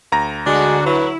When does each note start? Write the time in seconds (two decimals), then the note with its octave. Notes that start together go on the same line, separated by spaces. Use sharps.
0.12 D2 A#5 A#6
0.46 D3 G#3 D4 F#4
0.86 F#3 E4 B4